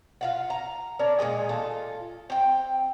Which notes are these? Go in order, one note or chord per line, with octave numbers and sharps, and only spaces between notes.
F4 F5 F#5
A#5
C#4 D4 A#4 D5
A#2 D#3 G#3 G#5
F4 A4
C4 G5